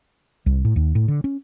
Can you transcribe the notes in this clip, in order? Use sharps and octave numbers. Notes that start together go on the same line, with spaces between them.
C2
A2
D#2
A2
D3
C#4